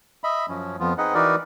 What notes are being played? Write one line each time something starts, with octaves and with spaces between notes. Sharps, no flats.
D#5 E5 B5
F#2 F3 C#4
F2 F3 B3 F4
C4 D#4 G#4 B4 D#5 F#5
E3 D#4 F#4 A#4 B4 D5